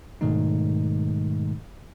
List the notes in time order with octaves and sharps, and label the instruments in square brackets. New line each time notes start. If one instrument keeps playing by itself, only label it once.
[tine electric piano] G#2 B2 D#3 G#3 A3 D#4